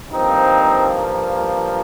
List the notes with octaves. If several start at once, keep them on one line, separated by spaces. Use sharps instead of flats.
G2 F3 A#3 C4 D#4